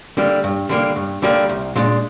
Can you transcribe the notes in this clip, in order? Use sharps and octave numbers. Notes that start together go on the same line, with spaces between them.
D3 G3 A#3
G2
D3 G3 A#3
G2
D3 G3 A#3
C2
A#2 G#3 D4